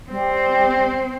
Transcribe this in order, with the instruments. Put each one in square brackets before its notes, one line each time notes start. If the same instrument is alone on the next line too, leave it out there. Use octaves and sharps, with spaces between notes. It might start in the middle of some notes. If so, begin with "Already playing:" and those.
[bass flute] G3 [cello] C4